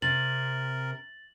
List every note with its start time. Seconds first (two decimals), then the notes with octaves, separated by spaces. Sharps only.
0.02 C3 A#4 A6 F#7